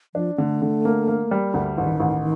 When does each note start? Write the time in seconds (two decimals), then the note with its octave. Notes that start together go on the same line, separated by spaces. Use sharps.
0.15 F3 D4
0.38 D3 A3
0.62 D3
0.85 A#3
1.08 A#3
1.31 G3
1.54 D2
1.76 A1 D#3
2.00 A1